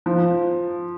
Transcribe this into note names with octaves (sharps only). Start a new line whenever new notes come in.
F3